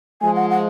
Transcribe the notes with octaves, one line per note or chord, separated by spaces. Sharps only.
F3 G#3 G#5
F#5
F#5